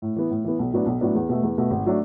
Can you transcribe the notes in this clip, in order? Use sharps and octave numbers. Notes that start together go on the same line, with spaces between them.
A2
E3 B3
A2
E3 B3
B1
A2 F#3 B3 D4
B1
A2 F#3 B3 D4
E2
B2 A3
E2
B2 A3
G#1
F#3 A3 D4